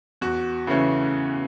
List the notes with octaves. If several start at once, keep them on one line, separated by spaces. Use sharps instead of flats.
E2 F#4
C#3 E3 A3 C#4